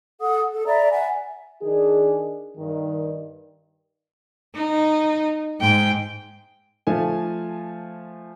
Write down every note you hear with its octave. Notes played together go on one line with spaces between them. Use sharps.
A4 F#5 D#6
A4
D5 E5 A#5 B5
E5 F#5 G#5
D#3 D4 G#4
G2 D#3
D#4
G#2 G5
F3 A3 G#5